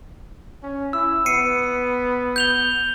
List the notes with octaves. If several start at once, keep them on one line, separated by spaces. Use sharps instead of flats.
C#4
E4 E6
B3 C7 C#7 D#7
G6 F7 G7